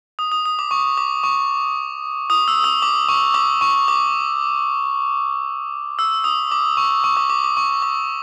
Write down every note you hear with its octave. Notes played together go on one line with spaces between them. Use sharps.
D#6
D#6
D#6
D6
C#6
D6
C#6
D#6
E6
D#6
D6
C#6
D6
C#6
D6
E6
D#6
D6
C#6
C#6
D6
D6
D6
C#6
D6